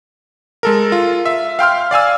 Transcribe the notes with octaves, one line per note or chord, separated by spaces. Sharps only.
G#3 A4 A#4
F4
E5
F5 G5 C6 F6
D5 F5 G#5 E6